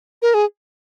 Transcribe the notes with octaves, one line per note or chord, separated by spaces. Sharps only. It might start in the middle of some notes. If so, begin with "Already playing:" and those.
A#4
G#4